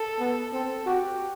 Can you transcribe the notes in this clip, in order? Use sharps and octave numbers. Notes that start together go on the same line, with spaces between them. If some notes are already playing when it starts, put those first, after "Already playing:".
Already playing: A4
B3
C4 A4
F#4 G4